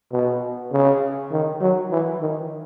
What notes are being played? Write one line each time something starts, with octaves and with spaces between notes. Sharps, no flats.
B2
C#3
D#3
F#3
E3
D#3